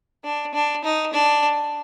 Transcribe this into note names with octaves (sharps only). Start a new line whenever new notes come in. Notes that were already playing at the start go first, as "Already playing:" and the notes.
D4
D4
D#4
D4